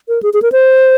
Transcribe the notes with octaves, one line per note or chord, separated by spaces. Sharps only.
A#4
G#4
G#4
A#4
C5